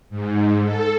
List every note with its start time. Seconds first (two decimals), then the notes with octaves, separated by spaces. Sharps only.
0.10 G#2
0.64 A4